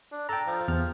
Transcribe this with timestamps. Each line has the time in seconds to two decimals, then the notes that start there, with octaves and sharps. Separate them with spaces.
0.12 D4
0.29 A4 G5 A#5
0.47 F3
0.68 E2 F6